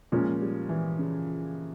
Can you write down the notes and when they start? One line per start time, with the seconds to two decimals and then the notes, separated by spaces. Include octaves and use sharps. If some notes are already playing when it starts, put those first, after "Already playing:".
0.12 A#2 F3 G#3 C#4
0.41 G3
0.69 E3
0.98 C#3